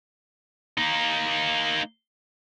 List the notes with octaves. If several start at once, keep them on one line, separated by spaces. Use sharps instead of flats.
A#3 D#4